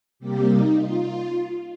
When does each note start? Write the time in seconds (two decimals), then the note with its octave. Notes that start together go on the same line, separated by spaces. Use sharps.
0.19 C3 G3 A#3 G4
0.48 D#4
0.77 F4